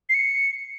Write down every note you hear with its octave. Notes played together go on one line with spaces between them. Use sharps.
C7
C#7